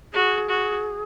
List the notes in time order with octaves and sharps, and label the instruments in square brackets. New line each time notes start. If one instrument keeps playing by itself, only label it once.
[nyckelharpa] F#4 [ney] G#4
[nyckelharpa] F#4